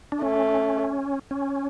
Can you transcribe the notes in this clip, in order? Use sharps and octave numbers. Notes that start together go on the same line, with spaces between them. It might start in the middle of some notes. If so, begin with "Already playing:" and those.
D4
A3 C#4
C#4